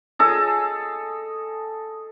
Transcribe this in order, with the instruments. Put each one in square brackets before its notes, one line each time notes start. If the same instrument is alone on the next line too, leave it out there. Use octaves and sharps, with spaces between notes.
[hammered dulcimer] G#4 A4 D#5